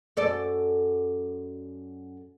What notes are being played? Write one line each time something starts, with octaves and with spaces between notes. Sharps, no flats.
F#2 A4 D5